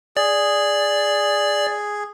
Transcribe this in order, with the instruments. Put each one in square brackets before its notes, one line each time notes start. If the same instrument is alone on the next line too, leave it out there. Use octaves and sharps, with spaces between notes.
[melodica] G#4 [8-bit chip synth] D5